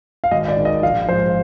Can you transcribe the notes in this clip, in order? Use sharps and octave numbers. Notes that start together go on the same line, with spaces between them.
F5
G#1 D#5
D5
G#2 D#3
D#5
A#1 F5
G#2 F3 C5